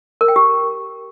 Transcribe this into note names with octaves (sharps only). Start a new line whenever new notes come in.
A#4
G5
G4